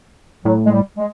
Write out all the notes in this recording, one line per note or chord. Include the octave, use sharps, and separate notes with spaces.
A2 F#3
G#3
G3
G#3